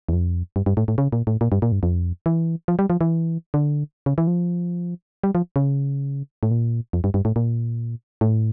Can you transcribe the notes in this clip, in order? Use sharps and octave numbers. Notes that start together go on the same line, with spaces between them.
E2
F2
G2
G2
A2
A2
C#3
A#2
A2
A#2
G2
A#2
G2
F2
E3
F3
G3
F3
E3
D3
C#3
E3
F3
G3
F3
C#3
A2
A#2
F2
G2
G2
A2
A#2
A2